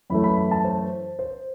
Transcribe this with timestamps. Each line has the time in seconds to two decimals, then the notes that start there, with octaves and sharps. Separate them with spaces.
0.10 F#2 E3 A3 B5
0.24 B5
0.37 B5
0.51 A5
0.64 C5
1.19 C5